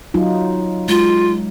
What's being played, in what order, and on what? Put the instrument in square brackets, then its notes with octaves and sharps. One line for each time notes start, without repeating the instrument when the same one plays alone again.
[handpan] F#3 D#4 F4
[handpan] G#3 [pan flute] F4